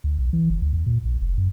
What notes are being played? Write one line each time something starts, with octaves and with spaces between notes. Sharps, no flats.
D2
B1
E3
F#1
D2
E2
A#2
A#1
F1
F#2